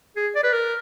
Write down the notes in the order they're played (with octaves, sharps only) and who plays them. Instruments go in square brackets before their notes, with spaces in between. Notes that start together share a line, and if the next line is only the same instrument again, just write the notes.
[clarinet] G#4
D5
B4
A#4